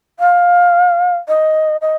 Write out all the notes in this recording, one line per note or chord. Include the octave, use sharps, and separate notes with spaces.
F5
D#5
D#5